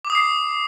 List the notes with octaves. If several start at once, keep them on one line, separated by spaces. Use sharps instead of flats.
D6
D#6
C7